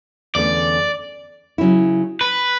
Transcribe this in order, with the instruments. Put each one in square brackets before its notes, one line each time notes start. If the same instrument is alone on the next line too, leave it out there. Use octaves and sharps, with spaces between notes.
[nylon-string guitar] E2 D3 A3 C#4 [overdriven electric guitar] D5
[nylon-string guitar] C#3 F#3 C#4 E4
[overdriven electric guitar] B4